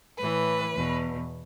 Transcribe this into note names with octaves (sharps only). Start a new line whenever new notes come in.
A2 E3 B4
E2 B2